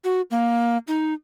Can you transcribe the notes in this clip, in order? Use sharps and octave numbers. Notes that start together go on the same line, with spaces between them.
F#4
A#3
D#4